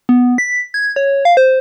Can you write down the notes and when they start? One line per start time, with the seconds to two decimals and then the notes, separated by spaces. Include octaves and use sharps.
0.09 B3
0.38 B6
0.74 G#6
0.96 C#5
1.25 F5
1.37 C5